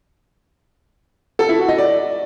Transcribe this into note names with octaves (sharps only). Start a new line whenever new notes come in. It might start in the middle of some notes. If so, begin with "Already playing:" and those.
A4
E4
F#4
D#5
D5